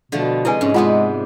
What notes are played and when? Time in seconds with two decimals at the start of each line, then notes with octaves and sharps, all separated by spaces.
0.12 B2 D3 F3 A3
0.45 C3 G#3 E4 B4 D#5 G#5
0.61 G#2 C#4
0.74 C3 G#3 B3 D4 F4 F#5 C6